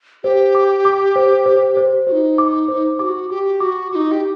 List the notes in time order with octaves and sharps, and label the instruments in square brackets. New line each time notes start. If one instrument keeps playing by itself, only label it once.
[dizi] G4 [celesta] C5
[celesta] D6
D6
C5
C5
C5
[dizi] F#4 [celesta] C5
[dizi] D#4
[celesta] D6
C5
[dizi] F#4 G4 [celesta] D6
[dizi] G4 [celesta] D6
[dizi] F#4 [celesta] D6
[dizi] F#4 [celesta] D6
[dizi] D#4
G4